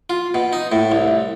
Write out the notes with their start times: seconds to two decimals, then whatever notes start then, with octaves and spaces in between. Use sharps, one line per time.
0.10 F4
0.34 B2
0.53 D#4
0.72 A2
0.92 C2